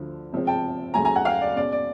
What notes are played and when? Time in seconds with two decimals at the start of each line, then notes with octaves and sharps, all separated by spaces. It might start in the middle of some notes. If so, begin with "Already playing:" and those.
Already playing: D2 D3 F3
0.32 C3 F3 G#3 C4
0.47 G5 A5
0.94 D#2 C#3 F#3 A3 G#5 A#5
1.05 G#5 A#5
1.15 F#5 G#5
1.25 F5 G5
1.42 D5
1.56 B2 G#3 C#4 D5
1.72 D5